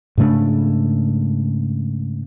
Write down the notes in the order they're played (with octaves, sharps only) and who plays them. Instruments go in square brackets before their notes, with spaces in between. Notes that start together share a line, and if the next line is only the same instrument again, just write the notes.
[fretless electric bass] G#2 C#3 A3 D4